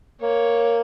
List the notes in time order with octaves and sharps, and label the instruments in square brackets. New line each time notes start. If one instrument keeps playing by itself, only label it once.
[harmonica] A#3 [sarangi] C#5